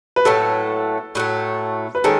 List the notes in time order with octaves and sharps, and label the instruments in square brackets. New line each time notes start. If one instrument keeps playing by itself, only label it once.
[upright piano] B4
[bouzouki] A2 F#3 A3 [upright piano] A4
[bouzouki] A2 F#3 A3
[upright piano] B4
[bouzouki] D#3 G#3 C#4 [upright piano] A4